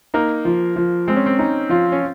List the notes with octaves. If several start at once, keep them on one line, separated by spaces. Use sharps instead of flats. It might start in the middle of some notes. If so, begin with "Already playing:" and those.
A#3 D#4
F3
F3
G#3 C4
C#4
C4
C#4 D#4
F3 F4
C#4